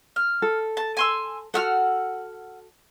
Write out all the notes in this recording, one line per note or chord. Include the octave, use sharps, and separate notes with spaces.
F6
A4
A5
G#5 C6 E6
F#4 A4 F#5 E6 F6